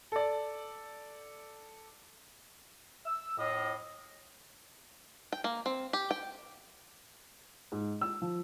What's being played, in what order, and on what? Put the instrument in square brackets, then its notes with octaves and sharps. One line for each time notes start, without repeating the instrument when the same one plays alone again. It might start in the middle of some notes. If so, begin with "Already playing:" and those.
[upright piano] A4 D5
[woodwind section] E6
F2 A2 D#5
[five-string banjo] G5
A#3
C4
G4
G5
[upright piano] G#2
E6
F3